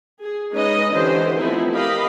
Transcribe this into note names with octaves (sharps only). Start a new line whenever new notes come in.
G#4
G#3 C#4 D#4 B4 D#5
D3 E3 C#4 G4 C5
F3 A3 B3 C4 D#4 E4
G4 A#4 D#5 F5 B5